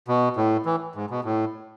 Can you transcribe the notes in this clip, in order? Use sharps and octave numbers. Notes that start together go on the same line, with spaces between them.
B2
A2
E3
G#2
B2
A2